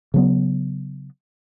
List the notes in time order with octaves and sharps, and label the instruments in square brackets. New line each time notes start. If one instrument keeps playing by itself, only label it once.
[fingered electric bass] C#3 F#3 B3